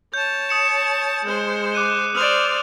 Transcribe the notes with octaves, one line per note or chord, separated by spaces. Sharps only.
C#5 A5 G6
D#6 C#7 E7
G#3 C5
D6 F#6 D#7
C5 D5 D#6 F6 F7